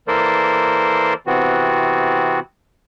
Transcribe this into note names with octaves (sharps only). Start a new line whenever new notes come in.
E3 A#3 A4 A#4 C5 D5
C3 E3 B3 C4 F#4